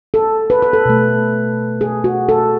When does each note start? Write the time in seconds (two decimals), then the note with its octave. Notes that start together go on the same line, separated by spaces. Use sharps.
0.14 A4
0.50 B4
0.62 B4
0.73 A4
0.86 B2 A3
1.81 G#4
2.04 F#4
2.29 A4